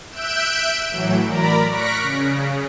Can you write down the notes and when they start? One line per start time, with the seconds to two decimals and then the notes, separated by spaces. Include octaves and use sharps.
0.10 E5 E6 F#6 G6 D7 E7
0.90 A2 E3 F#3
1.26 A#4 D5 A#5 B5
1.68 C#6 F6 F#6 A#6 B6 D7
2.02 C#3